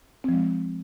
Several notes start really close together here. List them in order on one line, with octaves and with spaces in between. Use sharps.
C4 F3 G#3